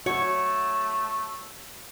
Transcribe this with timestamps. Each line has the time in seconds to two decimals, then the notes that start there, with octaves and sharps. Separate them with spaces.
0.06 A3 F#4 C#5